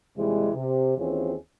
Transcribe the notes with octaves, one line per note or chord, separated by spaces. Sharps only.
D#2 C3 E3 G3 G#3
C3
D#2 E3 C4 C#4 F4 G#4